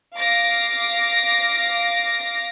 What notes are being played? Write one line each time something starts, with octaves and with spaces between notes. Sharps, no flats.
F5 D6 A#6